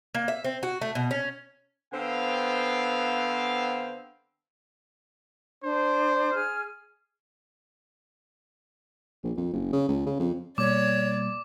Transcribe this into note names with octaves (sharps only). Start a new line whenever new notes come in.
A#3
E5
C4
F#4
A3
B2
C#4
D3 B3 C4 C5 F5 G5
D4 C5
G#4 F6
A#1
F2
F#1
C#3
C#2
C#3
F2
B2 G3 A#3 C#5 D5 D6